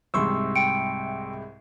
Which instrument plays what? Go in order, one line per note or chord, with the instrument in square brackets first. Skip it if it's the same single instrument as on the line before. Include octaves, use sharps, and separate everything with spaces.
[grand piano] C2 G#2 C3 [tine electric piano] C6 C#6 E6
[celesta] G5 C#7 D7